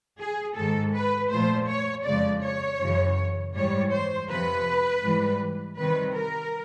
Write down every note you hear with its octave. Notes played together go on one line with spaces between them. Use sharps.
G#4
G#2 D#3 G#3 A4
B4
A#2 F3 A3 C5
C#5
F2 C#3 F3 G#3 D5
C#5
F#2 C#3 E3
G#2 E3 G3 C#5
C5
F2 C3 F3 B4
G#2 E3 G3
C3 D#3 G3 B4
A#4